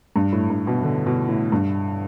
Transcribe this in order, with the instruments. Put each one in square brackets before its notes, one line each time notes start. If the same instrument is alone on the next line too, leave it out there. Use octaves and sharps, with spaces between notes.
[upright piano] G2
A2
G2
B2
D3
B2
A2
G2